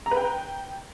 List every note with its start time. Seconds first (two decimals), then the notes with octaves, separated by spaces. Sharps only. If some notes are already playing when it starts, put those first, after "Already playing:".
0.06 A#5
0.11 B4
0.17 G5